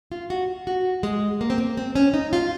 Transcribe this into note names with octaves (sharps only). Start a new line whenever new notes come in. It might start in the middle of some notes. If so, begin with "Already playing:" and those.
F4
F#4
F#4
G#3
A#3
C4
A#3
C4
C#4
D#4
F4